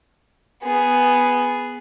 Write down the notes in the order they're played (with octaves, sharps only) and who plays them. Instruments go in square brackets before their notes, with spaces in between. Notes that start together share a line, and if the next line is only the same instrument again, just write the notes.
[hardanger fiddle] B3 G#4